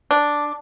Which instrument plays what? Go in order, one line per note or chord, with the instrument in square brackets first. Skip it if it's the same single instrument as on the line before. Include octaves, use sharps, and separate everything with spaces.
[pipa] D4